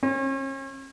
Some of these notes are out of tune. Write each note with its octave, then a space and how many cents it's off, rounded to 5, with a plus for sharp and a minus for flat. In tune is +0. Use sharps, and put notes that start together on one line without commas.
C#4 -40